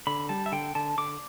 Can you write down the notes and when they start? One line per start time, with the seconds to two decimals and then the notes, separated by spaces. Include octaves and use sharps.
0.07 D3 B5
0.29 G3 A5
0.46 E5
0.52 D3 G5
0.75 D3 A5
0.98 D3 D6